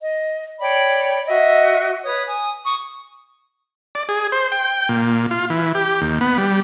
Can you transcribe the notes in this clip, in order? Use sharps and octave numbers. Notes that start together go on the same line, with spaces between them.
D#5
C#5 D5 G5 B5
F#4 D#5 E5
B4 C#5 D#6
G#5 D#6
C#6 D#6
D5
G#4
C5
G5
A#2
F4
E3
G4
D#2
B3
G3